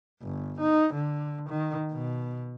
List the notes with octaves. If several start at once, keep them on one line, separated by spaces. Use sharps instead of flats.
G1
D#4
D3
D#3
B2